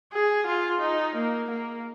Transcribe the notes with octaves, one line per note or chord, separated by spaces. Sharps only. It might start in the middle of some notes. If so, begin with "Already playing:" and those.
G#4
F4
D#4
A#3
A#3